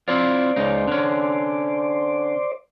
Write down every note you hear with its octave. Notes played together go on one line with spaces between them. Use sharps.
C4 E4 F4 C5 D5
C#2 C#3 D#4
D3 C#4